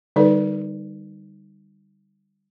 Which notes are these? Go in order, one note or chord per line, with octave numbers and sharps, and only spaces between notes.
D3 G3 D#4 A4 B4 D5